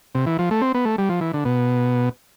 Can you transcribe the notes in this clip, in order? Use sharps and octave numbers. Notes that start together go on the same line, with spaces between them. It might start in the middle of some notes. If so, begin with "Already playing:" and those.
C3
E3
F3
A3
C4
B3
A3
G3
F3
E3
D3
B2